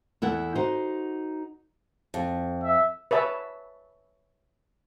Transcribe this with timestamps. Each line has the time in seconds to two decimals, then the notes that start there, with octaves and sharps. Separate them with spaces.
0.22 E2 E4 A4 F#5
0.55 D#4 F#4 C5
2.14 F2
2.63 E5
3.11 B4 C#5 E5 A5